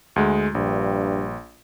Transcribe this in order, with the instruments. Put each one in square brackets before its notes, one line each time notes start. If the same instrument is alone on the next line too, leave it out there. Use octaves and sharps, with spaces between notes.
[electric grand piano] D2 G#3
[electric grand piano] A#1 [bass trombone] G2